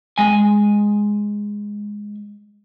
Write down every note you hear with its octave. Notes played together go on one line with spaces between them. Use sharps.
G#3 G#5